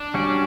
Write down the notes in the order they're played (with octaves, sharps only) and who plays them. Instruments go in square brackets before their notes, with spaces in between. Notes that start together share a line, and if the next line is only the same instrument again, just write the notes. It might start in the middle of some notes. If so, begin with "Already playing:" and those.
Already playing: [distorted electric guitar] D4
[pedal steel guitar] G3 C#4 F#4